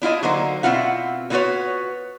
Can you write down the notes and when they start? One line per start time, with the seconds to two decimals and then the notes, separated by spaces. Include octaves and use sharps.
0.02 D4 E4 F4 D#5
0.23 D3 F#3 A#3 D#4 C5
0.63 B2 C4 E4 F4 F#5
1.30 D3 B3 F4 F#4 B4 C#5